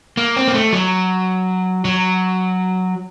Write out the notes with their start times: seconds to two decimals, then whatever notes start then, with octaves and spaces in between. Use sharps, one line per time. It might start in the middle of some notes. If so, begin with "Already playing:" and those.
0.17 A#3
0.36 C4
0.48 A#3
0.54 A3
0.73 F#3
1.85 F#3